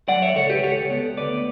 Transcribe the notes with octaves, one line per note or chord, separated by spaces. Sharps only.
F#3 D5 F#5
C#5 E5
C#2 A4 C#5
G4 B4
C#2 A4 C#5
B3
D2 B4 D5